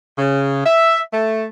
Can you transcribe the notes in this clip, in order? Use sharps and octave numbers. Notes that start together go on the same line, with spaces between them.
C#3
E5
A3